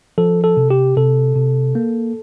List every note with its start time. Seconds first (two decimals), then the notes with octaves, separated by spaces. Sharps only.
0.18 F3 A4
0.44 A4
0.57 C3
0.70 G4
0.97 C3 A4
1.36 C3
1.75 A#3